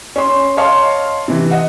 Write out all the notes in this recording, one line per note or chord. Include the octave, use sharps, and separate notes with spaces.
C#4 C6
C#5 D#5 F5 A5 C6
C3 E3
D#5 F#5